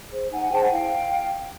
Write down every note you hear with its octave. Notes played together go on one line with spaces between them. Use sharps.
G#4 C5
D#4 F#5 G#5
F#5 G#5
G#4 C5 G5 A5
F#5 G#5
E4 F5 G5